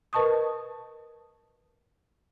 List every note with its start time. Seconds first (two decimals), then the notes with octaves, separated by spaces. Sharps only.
0.13 A#4 B4 D#5 A5 C#6 D#6